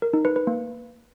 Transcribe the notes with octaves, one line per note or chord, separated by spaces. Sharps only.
A#4
D#4
B4
B4
A#3